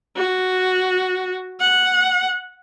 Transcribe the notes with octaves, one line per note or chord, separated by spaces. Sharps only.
F#4
F#5